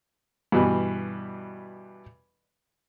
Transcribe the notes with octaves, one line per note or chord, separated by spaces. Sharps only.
G2 B2 E3